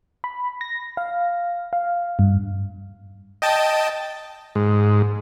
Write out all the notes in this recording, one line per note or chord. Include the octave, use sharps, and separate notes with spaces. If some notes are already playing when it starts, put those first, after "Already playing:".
B5
A#6
F5
F5
G2
D#5 G5 A5
G#2